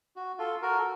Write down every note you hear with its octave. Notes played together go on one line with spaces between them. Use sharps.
F#4
F4 A4
F#4 A#4
A4